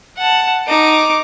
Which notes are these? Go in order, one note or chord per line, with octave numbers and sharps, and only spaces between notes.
F#5 A5
D#4 D6